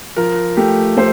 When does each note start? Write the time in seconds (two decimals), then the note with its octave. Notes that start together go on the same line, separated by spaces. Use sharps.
0.16 F3 A#4
0.57 A3 G4
0.97 A3 C5